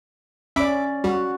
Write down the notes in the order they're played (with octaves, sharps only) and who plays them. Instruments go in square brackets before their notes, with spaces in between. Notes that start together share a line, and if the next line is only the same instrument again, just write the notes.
[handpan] C#4 D5 [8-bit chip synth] E5 B5 D6
[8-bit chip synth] G3 [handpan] F#4